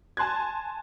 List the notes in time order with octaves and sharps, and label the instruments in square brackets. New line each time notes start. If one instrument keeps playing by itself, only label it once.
[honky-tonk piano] G#5 A5 C6 F#6 G#6